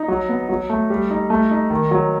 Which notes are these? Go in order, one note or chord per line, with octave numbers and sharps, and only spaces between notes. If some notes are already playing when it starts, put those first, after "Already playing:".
Already playing: D#4
F#3
B3
F#3
A3
G3
D#4
A3
D#4
D#3
F#3